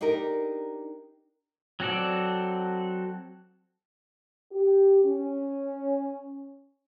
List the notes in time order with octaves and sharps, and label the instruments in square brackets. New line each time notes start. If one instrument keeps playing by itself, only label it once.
[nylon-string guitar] D4 D#4 G4 A#4
[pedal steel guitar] F#3 C4 F#4 A4 D5
[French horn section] G4
C#4